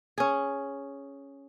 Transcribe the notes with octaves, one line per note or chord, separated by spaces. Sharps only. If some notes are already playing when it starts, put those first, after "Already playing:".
C#4 G#4